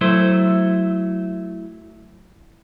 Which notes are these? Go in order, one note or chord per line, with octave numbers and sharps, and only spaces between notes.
F#3 A3 E4 C5